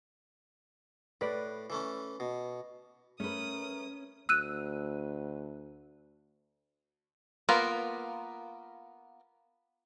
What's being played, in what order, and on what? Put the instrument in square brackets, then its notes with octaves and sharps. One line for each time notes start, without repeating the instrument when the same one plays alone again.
[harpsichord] A2 [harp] B4 D5 F#6
[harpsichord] E3 A3 C#4
B2
[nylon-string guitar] A3 B4 [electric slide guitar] C#4 [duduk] A#4 [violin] D#6
[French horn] D2 [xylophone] E6 F#6 D#7
[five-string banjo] A#3 B3 F4 A#4